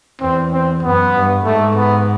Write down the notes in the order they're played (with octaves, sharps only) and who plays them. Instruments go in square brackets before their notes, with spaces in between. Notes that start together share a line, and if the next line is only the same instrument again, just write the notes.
[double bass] E2 [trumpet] C4
[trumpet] C4
[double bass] F#2 [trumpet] B3
[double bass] G2
[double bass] G#2 [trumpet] A3
[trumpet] B3